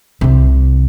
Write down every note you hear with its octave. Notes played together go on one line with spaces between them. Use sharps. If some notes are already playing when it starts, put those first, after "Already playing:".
C2 C3